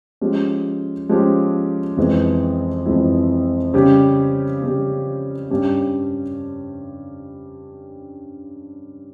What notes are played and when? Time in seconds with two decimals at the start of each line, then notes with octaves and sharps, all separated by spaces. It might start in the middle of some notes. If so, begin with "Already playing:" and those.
0.21 F3 G#3 C#4 G4
1.09 F3 G#3 C#4 G4
1.97 F2 E3 G#3 E4
2.86 F2 E3 G#3 E4
3.74 C#3 G3 C#4 G4
4.62 C#3 G3 C#4 G4
5.51 G2 G3 C#4 G4